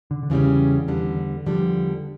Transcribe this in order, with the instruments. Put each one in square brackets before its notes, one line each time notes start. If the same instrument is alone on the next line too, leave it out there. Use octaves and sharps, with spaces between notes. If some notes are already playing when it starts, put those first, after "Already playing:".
[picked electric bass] D3
D3
[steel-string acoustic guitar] E2 C#3 G3 C#4 [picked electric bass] E3
[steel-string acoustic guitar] E2 D3 G3
[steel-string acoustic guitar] E2 D3 G3 [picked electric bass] F3